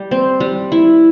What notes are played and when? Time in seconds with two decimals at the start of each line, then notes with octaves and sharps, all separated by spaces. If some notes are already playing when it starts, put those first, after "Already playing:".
Already playing: G3
0.11 C4
0.40 G3
0.72 E4